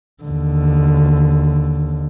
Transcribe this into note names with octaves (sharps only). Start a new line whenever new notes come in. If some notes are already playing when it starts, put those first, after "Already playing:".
D#2 D3